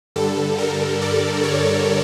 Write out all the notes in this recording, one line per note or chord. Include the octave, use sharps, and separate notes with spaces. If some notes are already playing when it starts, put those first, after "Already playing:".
G2 D3 G3 A4
A#4
D5
C#5